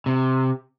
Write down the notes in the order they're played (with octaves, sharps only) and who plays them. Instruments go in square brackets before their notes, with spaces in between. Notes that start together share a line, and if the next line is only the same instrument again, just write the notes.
[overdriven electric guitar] C3